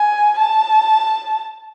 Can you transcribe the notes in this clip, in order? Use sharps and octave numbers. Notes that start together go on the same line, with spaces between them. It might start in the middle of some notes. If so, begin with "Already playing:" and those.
Already playing: G#5
A5